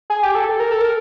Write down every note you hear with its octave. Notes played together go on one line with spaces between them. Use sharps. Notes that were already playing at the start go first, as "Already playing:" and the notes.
G#4
G4
A4
A4
A#4
A4
A#4